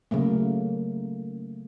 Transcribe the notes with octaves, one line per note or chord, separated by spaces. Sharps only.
C#3 F#3 A3 A#3